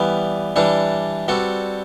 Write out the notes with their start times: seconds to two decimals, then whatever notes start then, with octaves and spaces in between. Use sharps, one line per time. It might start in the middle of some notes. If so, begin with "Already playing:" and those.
Already playing: E3 G3 B3 B4 D5
0.56 E3 G3 D4 A4 B4 D5
1.27 G3 C4 F#4 A4 B4 D5